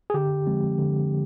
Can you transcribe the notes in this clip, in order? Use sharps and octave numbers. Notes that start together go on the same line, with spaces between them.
G#4
D3 G4
F3 G#3 C4
D3